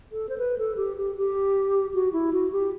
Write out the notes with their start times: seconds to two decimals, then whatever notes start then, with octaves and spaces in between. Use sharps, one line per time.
0.12 A4
0.29 C5
0.38 B4
0.58 A4
0.77 G4
0.97 G4
1.17 G4
1.94 F#4
2.13 E4
2.33 F#4
2.52 G4